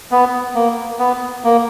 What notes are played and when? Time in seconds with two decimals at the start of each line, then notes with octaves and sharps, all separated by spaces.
0.12 B3
0.55 A#3
0.99 B3
1.44 A#3